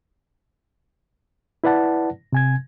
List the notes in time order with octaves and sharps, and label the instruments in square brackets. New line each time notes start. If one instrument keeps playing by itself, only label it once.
[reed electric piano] E4 B4 D5 F#5 A5
C3 G#5 G#6